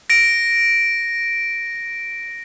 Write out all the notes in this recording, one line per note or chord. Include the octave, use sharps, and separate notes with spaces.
A#6 D7